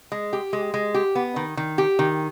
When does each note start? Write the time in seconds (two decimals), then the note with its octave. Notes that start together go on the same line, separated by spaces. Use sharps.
0.12 G#3
0.33 G4
0.53 G#3
0.74 G#3
0.94 G4
1.15 B3
1.36 D#3
1.57 D#3
1.78 G4
1.99 D#3